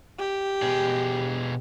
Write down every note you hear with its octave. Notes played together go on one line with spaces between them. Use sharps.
G4
B2 G#4